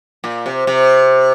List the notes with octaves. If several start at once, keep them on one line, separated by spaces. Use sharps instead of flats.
A#2
C3
C3